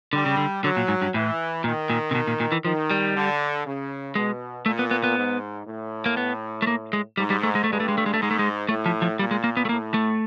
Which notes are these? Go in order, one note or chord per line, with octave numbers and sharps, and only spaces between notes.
D3 G3
C#3
D3
D3 F#3
A#2
G#2
G2
A2 E3
A#2 D#3
A#2
C3
B2
A#2
A#2
E3
D#3 F3
G3
D3
C#3
B2 G#3
A#2 A3
B3
B3
B3
G#2
A2
A#3
B3
A3
A#3
G#3
G#2 G3
G3
A3
G#3
A3
G2 G#3
A3
G#3
A3
G#3
A3
G#2 G#3
A3
G#3
A2 A3
F3
F3
A#2 G3
G#3
A#3
B3
A3
A2 A#3
A3